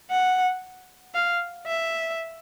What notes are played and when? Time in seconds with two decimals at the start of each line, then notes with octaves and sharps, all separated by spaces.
0.10 F#5
1.14 F5
1.67 E5